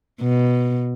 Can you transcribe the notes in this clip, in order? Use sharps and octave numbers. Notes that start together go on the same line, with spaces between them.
B2